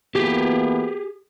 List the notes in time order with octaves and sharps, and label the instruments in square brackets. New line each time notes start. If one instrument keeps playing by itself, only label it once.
[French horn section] E3 A#3 B3 [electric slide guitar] G4 G#4